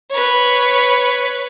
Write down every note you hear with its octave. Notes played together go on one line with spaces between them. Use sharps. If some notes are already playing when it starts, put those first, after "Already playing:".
B4 C#5